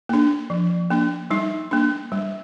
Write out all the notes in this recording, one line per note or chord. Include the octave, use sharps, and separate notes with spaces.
A#3 D4
F3
A#3 D4
G3 D#4
A#3 D4
G3